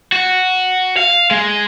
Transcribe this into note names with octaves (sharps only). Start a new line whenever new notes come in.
F#4
F5
G#3